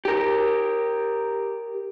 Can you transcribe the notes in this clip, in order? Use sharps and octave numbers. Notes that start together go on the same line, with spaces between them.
G4 A#4